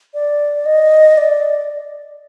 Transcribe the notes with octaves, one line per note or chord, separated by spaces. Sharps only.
D5
D#5
D5